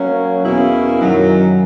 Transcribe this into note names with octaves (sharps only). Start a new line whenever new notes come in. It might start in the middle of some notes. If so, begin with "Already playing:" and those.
Already playing: F#3 A#3 C#4
E2 B2 A#3 C#4 E4
F#2 D#3 F#3